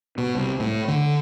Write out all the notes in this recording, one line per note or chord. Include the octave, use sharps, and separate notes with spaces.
B2
C2
A2
D3